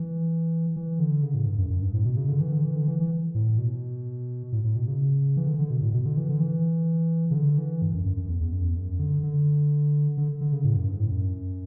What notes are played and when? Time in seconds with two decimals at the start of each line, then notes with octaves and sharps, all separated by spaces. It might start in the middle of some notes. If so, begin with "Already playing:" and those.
Already playing: E3
0.76 E3
0.99 D3
1.23 C#3
1.34 A2
1.46 G2
1.58 F#2
1.70 F#2
1.82 G2
1.94 A2
2.05 B2
2.17 C#3
2.29 D3
2.41 E3
2.52 D3
2.64 E3
2.76 D3
2.88 E3
3.00 E3
3.35 A2
3.58 B2
4.52 A2
4.64 A2
4.76 B2
4.88 C#3
5.37 E3
5.46 D3
5.59 D3
5.71 B2
5.82 A2
5.93 B2
6.05 D3
6.17 E3
6.29 D3
6.40 E3
7.31 C#3
7.35 D3
7.58 E3
7.82 G2
7.94 F#2
8.06 F#2
8.17 F#2
8.29 E2
8.41 E2
8.52 F#2
8.64 E2
8.76 F#2
8.99 D3
9.23 D3
10.17 D3
10.41 D3
10.53 C#3
10.64 A2
10.76 F#2
10.88 G2
11.00 A2
11.11 F#2